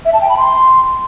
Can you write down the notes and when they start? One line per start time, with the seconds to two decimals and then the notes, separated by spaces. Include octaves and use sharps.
0.05 E5
0.13 A5
0.21 G5
0.29 B5
0.37 C6